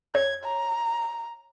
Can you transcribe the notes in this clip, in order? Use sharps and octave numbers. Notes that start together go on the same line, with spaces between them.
C#5 G#6
A#5